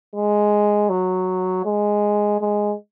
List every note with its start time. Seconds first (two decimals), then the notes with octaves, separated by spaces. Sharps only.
0.15 G#3
0.89 F#3
1.65 G#3
2.41 G#3